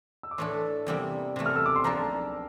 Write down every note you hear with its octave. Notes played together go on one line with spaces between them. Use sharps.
E6
D6
A2 E3 A3 D4 A4 C6
E2 C3 G3 A#3 E4
C3 E3 A3
F6
E6
D6
C6
F3 A#3 D4 A4 A#5